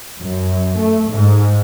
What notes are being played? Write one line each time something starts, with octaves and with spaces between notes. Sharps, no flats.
F#2
A3
G#2